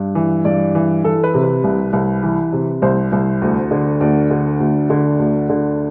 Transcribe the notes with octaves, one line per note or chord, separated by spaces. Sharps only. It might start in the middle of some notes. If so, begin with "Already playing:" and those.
Already playing: G2
E3
G2 D5
E3
E3 A4
B4
C3
B4
C2
C2
E3
C3
C2 C5
C2
D2
D3
D2 D5
D3
D2
D3
D2
D3